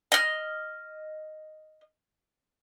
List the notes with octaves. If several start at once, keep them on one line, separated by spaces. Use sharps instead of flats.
D#5 F6